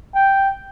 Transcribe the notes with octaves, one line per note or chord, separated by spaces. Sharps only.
G5